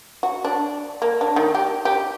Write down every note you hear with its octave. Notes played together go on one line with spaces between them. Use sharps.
F#4
D4
A#3
D4
D#3
G4
G4